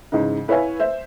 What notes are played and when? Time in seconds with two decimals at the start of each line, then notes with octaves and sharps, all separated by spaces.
0.12 G#2 C#3 E3 D#4
0.48 E4 B4 C#5 E5 F5 G#5
0.80 C5 E5